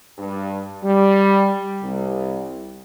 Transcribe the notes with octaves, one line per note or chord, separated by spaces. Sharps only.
G2
G3
C2